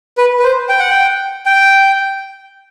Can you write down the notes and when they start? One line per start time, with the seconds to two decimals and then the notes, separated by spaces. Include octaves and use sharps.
0.18 B4
0.39 B4
0.44 C5
0.69 G5
0.79 F#5
0.90 G5
1.46 G5